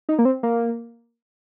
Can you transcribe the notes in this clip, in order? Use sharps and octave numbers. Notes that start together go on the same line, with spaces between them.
D#4
A#3
C4
A#3